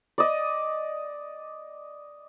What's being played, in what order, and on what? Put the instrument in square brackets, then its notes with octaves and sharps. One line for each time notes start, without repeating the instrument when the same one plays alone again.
[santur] D5 D#5